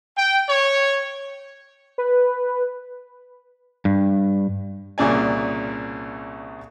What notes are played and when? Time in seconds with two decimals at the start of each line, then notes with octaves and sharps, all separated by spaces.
0.16 G5
0.48 C#5
1.98 B4
3.85 G2
4.98 C2 A#2 C#3 D5 G#5